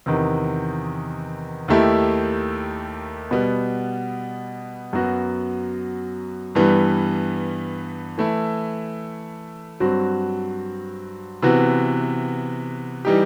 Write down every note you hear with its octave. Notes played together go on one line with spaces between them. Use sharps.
E2 C3 D#3
D#2 D#3 A3 E4 G4
B2 G3 B3
F#2 F#3 B3 F#4
G2 E3 G3 B3
E3 A3 E4
G2 F#3 C4 F#4
C3 E3 B3 F#4
E3 G3 D#4 G4